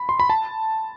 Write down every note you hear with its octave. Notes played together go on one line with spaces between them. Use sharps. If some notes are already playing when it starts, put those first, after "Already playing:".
Already playing: B5
C6
B5
A5